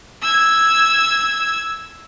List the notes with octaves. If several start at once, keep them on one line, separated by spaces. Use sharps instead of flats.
E6 G#6